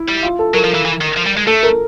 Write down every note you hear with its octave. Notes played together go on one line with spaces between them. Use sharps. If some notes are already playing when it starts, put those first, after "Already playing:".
Already playing: E4
G3
F4
A4
F#3 A#4
F3
E3
E3
D#3
F3
G3
G#3
A3 A4
A#4